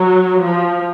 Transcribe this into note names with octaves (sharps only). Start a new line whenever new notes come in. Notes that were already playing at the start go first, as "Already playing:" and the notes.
Already playing: F#3
F3